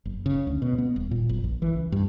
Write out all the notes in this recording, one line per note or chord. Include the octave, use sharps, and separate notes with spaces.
F#1
C#3
D2
B2
B3
D#1
A#2
F#1
A#1
E3
C#2
G2